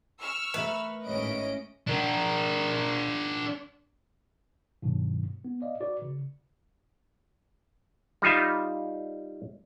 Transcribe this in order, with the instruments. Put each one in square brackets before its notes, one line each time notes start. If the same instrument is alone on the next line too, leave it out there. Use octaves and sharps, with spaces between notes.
[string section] C#6 E6 F6
[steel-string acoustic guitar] A3 A#4 E5 [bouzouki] B4
[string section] G#1 A2 [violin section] C#4 D#5 D7
[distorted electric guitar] D4 A#4
[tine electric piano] G2 B2 D#3 F#3
B3
D5 D#5 F5
F#4 B4 D5
C#3
[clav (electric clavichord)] G3 D#4 F4 E5